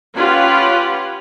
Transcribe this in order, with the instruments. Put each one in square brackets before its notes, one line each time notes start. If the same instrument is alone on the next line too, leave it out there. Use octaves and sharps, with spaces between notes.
[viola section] C#4 F4 G4 B4 F#5